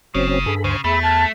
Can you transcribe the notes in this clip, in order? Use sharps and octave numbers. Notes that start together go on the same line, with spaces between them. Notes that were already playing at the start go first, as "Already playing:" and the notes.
F#1 C#3 F#3 C4 C#4
G2 G#4 A4 B5
D2 C#3 C5 G#5
E2 A3 G#4 E5 B5
A5 F6 F#6 G#6